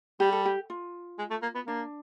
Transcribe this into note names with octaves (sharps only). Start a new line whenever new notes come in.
G3 G4
A4
G4
F4
G#3
A3
A#3
B3
A#3 D4